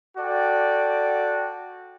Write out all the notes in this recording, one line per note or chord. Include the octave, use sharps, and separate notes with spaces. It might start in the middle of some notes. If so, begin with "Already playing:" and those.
F#4 A4 D5 G5